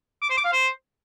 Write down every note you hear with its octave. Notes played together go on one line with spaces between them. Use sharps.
D6
C5
D6
F5
C5